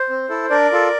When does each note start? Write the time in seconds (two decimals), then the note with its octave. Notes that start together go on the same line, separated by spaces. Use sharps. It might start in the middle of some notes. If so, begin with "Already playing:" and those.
Already playing: C5
0.09 C4
0.29 E4 A4
0.50 D4 A#4 D5
0.72 F4 A4